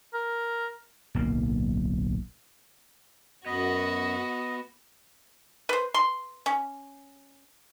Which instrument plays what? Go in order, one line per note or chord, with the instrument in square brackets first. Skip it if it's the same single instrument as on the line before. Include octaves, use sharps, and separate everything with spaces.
[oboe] A#4
[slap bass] D1 B1 A#3
[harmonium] F#2 [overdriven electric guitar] B3 [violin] F#4 [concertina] D#5
[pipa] B4 C5
C6
C#4